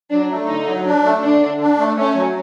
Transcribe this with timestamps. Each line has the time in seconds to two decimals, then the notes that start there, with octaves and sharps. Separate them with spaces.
0.12 F#3 D4
0.31 A3
0.49 D3 D#4
0.67 F#3
0.86 D4
1.05 A3
1.22 D3 D4
1.41 D3
1.60 D4
1.79 A3
1.97 A3 C#4
2.15 F#3